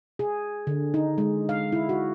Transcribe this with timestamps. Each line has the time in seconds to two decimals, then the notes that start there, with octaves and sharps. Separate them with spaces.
0.19 G#4
0.67 D3
0.94 D#4
1.18 G#3
1.49 F5
1.72 E4
1.89 F#4